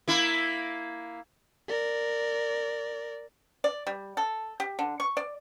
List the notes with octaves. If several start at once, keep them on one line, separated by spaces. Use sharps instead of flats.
A#3 E4
A#4 D5
D5
G3
A4
G4
D3
C#6
D5